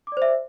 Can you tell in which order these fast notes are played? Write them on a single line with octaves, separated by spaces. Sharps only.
D6 D5 C5 E5